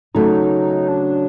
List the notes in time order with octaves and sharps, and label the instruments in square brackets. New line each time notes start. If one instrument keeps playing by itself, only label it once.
[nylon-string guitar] C#3 F#3 A3 [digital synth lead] D#4
[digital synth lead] D4